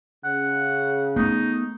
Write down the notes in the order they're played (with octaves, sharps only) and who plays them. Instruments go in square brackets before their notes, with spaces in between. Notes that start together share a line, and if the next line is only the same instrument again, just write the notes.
[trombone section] C#3 [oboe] F#5
[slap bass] A3 B3 [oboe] D#4